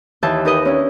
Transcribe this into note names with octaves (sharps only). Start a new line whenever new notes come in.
D#2 E3 E5 A5 G6
D#4 G4 A#4 B4 D#5
C#4 D4 E4